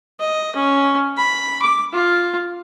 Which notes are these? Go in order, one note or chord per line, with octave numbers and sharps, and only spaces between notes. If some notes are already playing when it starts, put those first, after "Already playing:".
D#5
C#4
B5
D6
F4